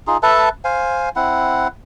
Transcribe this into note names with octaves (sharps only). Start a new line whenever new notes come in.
D#4 F4 G#4
A4 B4 E5 A5
C5 F5 G#5
C4 E4 F#5